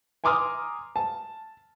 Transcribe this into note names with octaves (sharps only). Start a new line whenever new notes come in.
G#5 A#5 C6 D6 D#6 F6
A5